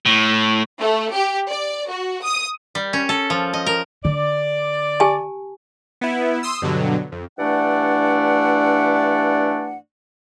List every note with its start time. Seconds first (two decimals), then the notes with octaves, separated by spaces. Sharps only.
0.06 A2
0.80 A3
1.14 G4
1.50 D5
1.89 F#4
2.23 D#6
2.75 G3
2.93 C#4
3.09 A4
3.30 F3
3.53 D#5
3.66 A#4
4.05 D3 D5
5.00 G4 G#5 A5
6.01 B3 E4
6.43 C6 D#6 E6
6.62 G2 B2 D3 F#3
7.12 F2
7.38 G2 E3 A3 D4 D5 F#5